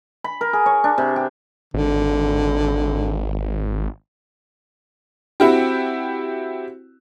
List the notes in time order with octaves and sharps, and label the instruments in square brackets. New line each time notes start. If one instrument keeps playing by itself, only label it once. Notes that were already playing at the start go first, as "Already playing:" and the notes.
[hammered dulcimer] B5
A#4
G#4
C#5
D4
C3
G4
[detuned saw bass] G#1 [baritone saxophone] D3
[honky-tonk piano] C4 E4 F#4 G4